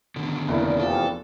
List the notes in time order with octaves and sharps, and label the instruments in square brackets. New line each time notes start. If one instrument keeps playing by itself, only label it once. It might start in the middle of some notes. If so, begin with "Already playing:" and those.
[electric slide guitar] B2 D3 D#3
[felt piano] F1 A#3 E4 [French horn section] D#2 D5
[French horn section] E2 F3 G4 [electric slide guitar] A4